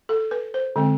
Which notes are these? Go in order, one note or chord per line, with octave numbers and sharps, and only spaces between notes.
A4
B4
C5
D3 G#3 C4